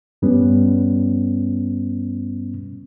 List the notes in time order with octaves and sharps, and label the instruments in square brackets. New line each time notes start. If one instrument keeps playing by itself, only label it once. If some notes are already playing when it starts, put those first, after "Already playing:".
[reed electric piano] G2 G3 B3 C#4